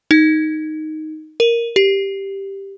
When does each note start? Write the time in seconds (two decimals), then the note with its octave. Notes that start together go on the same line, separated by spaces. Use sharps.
0.11 D#4
1.40 A#4
1.76 G4